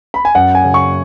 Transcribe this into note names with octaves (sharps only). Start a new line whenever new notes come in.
B5
G#5
F#2 F#5
G#5
C#3
C#6